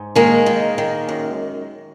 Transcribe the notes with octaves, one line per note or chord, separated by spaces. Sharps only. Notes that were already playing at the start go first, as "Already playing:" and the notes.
Already playing: G#2
D#3 G#3 A#3
D#3
D#3
F#2